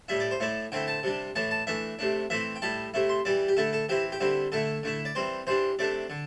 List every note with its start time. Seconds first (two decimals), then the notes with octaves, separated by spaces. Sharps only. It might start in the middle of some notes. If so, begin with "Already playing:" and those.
0.08 A2 G3 E4 E5
0.20 D5
0.31 C5
0.40 A2 A3 E4 D5
0.72 D3 A3 C4 E4 G5
0.88 A5
1.03 C3 G3 D4
1.36 A2 E3 A3 A5
1.51 A5
1.67 E3 A3 D4 E5
1.99 C3 A3 D4
2.30 E3 A3 C4 E4 E5
2.56 G5
2.62 A2 G3 E4 A5
2.94 C3 A3 E4
3.09 C6
3.25 E3 G3 E4 D5
3.48 G4
3.57 D3 A3 E4 A4
3.73 A4
3.89 E3 C4 E4 G4
4.12 G4
4.20 D3 G3 C4 E4
4.52 D3 A3 E4 A4
4.83 D3 A3 E4
5.05 D5
5.15 E3 G3 C4 C5
5.47 E3 G3 D4 C5
5.79 C3 A3 D4 D5
6.10 D3